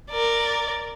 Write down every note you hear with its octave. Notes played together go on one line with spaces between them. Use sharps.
A#4 D5